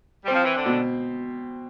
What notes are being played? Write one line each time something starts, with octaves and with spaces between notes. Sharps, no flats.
G3 C4
F3
E3
D3
B2